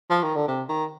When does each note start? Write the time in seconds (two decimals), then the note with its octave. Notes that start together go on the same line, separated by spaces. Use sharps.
0.10 F3
0.23 D#3
0.36 D3
0.48 C3
0.69 D#3